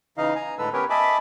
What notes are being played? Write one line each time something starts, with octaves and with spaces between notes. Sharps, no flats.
C#3 E3 D#4 D#5 F5
G#5 A#5
A2 D3 G#3 A4 B4 E6
B3 C#4 G4 A#4 B4 C#5
D#5 E5 G#5 A5 B5 D6